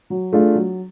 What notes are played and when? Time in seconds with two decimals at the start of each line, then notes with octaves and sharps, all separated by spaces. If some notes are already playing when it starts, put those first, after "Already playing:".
0.10 F#3
0.33 A3 D4 F4 G#4
0.55 F#3